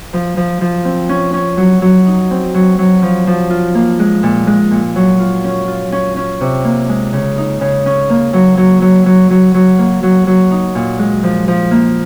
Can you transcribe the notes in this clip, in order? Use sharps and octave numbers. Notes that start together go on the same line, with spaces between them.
F3
F3
F3
C4
C#4
C#4
F#3
F#3
D#4
C4
F#3
F#3
F3
F3
F4
A#3
G#3
A#2
G#3
A#2
F#3
F4
C#4
F4
C#4
C#4
C3
A#3
G#3
C#3
D#4
C#3
C#4
A#3
F#3
F#3
F#3
F#3
F#3
F#3
A#3
F#3
F#3
D#4
A#2
G#3
F3
F3
A#3